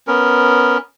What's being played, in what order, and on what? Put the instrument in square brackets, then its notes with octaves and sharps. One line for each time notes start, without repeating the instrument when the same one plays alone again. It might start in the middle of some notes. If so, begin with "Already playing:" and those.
[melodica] B3 C#4 A#4